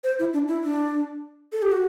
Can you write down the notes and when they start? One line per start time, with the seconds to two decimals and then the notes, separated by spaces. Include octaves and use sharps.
0.04 C5
0.19 E4
0.33 D4
0.48 E4
0.64 D4
1.52 A4
1.62 G4
1.72 F#4